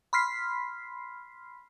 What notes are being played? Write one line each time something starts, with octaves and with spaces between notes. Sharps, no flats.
B5 C6 F6 B6 C7